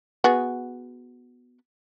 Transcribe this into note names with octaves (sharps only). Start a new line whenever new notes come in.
B3 F#4 G#4